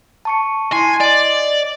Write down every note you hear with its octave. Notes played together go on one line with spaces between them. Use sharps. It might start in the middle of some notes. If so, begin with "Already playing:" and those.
A5 C#6 C#7
E4 G#5 C6 C7
D5 D#5